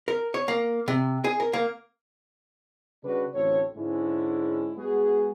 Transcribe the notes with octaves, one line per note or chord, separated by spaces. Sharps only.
A#4
C#5
A#3
C3
G#4
A#4
A#3
C#3 G3 D4 F#4 B4
A1 D2 C4 A4 C#5
G#2 D3 G#3 C#4 E4
G#3 B3 F#4 G#4